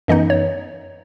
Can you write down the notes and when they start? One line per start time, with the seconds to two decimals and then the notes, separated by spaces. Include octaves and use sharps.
0.08 F#2 E3 B3 D#4 D#5
0.30 C#5